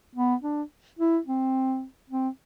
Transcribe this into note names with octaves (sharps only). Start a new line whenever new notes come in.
B3
D4
E4
C4
C4